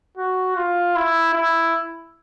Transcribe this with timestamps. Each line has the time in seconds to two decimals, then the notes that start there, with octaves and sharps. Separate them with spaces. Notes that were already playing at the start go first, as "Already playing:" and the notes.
0.17 F#4
0.56 F4
0.96 E4
1.34 E4